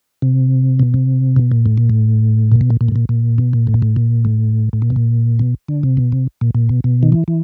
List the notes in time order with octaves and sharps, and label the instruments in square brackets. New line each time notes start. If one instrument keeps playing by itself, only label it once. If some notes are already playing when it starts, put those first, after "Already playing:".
[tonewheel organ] C3
B2
C3
B2
A#2
A2
A#2
A2
A#2
B2
A#2
A#2
A2
A#2
A#2
B2
A#2
A2
A#2
A2
A#2
A2
A2
A#2
B2
A#2
B2
D3
C3
B2
C3
A#2
A#2
B2
B2
D#3
E3
E3